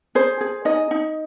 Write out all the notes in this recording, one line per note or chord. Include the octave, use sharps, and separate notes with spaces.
G#4 C5
G#4
D#4 D#5
D#4